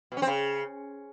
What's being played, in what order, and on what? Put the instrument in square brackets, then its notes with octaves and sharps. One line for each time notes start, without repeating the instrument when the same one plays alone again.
[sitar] B2
C#4
C4
C#3